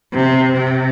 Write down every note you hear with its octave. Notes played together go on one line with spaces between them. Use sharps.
C3
C3